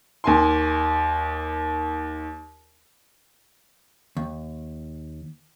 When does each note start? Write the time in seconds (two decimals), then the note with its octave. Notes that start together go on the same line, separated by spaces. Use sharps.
0.24 D#2 G#5 C6
4.17 D#2